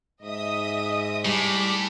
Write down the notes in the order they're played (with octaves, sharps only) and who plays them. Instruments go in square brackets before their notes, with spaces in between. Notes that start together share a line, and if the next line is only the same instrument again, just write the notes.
[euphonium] G#2 [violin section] D#5 E5 D#6
[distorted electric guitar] A2 [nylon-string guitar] G3 [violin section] G#4 D6 B6